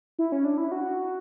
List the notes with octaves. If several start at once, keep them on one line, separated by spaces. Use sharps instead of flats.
E4
C#4
D4
E4
F#4